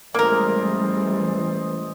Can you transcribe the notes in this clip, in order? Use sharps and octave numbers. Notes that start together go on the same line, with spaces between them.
A1 E3 G3 G#3 A#3 A#4 C5 D#5